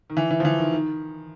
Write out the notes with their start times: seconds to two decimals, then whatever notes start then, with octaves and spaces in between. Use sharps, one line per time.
0.10 D#3
0.17 E3
0.31 E3
0.40 F3
0.45 E3
0.59 D#3
0.73 D#3